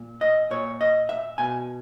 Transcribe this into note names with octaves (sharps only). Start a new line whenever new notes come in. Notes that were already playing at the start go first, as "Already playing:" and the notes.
Already playing: A#2
D#5
A#2 C#5
D#5
E5
B2 G#5